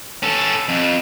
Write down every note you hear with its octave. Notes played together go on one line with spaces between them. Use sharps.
C#4 A4
F2